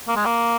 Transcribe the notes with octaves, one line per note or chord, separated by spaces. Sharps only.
A#3
G#3
A#3